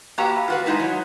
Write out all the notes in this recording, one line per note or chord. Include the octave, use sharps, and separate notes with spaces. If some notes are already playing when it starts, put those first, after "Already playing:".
A#3 F#4 G4 B4 E5 A#5
F4 F#4 B4
G#3 D#4 E4 B4
F#3